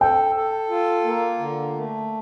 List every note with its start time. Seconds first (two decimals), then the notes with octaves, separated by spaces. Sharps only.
0.01 A4 G5
0.35 A4
0.70 F4
1.04 A#3
1.39 D3
1.73 A3